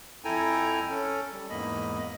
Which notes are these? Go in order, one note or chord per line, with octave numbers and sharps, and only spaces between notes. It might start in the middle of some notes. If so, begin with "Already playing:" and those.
F2 E4 A4 G5 G#5 A#5
C#4 A4
G3
E2 G#2 A#3 D#5 B5